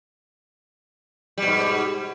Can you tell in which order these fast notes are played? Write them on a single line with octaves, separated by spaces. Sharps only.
G3 B2 G#2